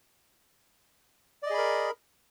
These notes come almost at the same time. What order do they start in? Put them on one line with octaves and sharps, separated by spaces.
D5 D#5 G#4 B5 A#4